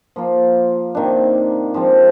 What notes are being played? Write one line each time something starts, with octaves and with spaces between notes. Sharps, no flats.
F3 A#3 F4
C3 D#3 A#3 D4
F3 G#3 C4 F4